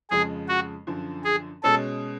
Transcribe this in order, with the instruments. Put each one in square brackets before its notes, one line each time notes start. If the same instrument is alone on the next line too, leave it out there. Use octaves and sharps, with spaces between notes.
[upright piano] F2 C#3 F3 G#3 [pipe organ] G#4
[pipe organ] F#4
[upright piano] F#2 D3 F3
[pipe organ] G#4
[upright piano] B2 G#3 C#4 [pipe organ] A4